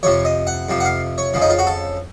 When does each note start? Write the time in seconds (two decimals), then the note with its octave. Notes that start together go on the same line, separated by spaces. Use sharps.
0.03 F2 C3 F3 C#5
0.25 D#5
0.47 F#5
0.69 F2 C3 F3
0.80 F#5
0.85 F5
1.18 C#5
1.34 F2 C#3 F3
1.42 D#4
1.50 F4
1.59 F#4
1.67 A4